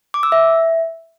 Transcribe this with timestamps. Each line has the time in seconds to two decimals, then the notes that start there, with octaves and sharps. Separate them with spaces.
0.14 D6
0.23 E6
0.32 E5